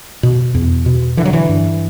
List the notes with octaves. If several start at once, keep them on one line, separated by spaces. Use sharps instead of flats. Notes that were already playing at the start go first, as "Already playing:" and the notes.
B2
E2
B2
D3 E3
F#3
E3
G2